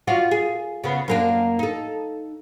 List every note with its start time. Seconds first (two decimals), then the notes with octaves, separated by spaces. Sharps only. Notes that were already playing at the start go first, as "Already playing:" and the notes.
0.07 F4 F#4 D5
0.31 G#4
0.84 C#3 B3
1.08 F#2 A#3 D4
1.59 D#4 A4